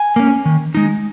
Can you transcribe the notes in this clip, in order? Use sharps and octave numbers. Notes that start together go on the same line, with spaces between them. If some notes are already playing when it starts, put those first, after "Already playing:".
Already playing: G#5
A#3 C#4
D#3
G#3 D#4